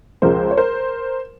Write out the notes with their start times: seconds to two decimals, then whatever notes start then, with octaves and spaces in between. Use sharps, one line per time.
0.22 C#2 C#3 F3 G#3 A#4 C5
0.51 C#5
0.57 A#4 C5